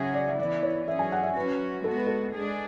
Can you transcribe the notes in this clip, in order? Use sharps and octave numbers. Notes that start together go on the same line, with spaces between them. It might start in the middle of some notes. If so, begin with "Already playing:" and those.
Already playing: C#3 F#3 C#4 G#4 E5 F#5
D5
E5
E3 B3 E4 D5
C#5
F#3 C#4 G#4 E5
G#5
F#5
E5
F#3 C#4 F#4 B4
G#3 B3 F#4 A4
B4
A4
G#3 D4 G#4